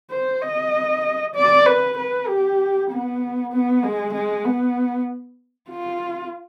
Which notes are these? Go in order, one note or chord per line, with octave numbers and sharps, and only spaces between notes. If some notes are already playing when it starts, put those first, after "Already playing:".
C5
D#5
D5
B4
B4
G4
B3
B3
G#3
G#3
B3
F4